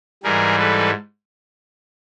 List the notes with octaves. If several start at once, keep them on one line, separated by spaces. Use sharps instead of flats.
G#2 E3 G3 G#4 A#4
A4 B4